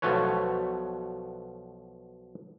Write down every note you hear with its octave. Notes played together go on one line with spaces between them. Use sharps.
B1 B2 F3 A3 B4 C#5